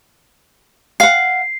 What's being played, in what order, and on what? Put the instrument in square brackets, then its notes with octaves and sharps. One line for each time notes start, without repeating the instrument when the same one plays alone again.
[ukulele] F5 F#5 [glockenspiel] C7